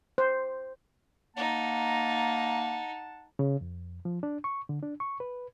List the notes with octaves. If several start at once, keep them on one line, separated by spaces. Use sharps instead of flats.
C5
A#3 D#4 F#5 A5
C#3
F2
F3
D4
C#6
D3
D4
C#6
B4